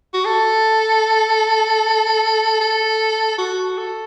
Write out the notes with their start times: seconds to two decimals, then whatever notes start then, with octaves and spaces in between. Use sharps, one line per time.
0.14 F#4
0.25 A4
2.60 A4
3.38 F#4
3.78 A4